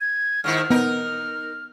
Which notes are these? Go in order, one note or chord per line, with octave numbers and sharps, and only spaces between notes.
G#6
G#2 D#3 E4 F6
B3 D#4 A#4